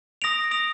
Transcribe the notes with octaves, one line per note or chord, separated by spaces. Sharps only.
D#6 A#6 D7 F7
D#6 A#6 D7 F7